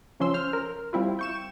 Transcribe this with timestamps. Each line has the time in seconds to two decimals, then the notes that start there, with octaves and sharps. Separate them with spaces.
0.20 C#2 F3 C#4 C6 E6
0.34 C5 F6
0.53 A#4
0.93 G3 C4 E4 F4
1.19 G5 C#6 E7